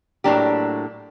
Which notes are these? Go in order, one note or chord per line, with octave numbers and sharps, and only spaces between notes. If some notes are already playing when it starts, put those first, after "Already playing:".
A2 F#3 A#3 D4 G4